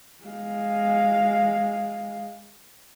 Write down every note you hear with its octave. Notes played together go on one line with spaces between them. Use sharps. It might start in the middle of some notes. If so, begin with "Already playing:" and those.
G#3 F5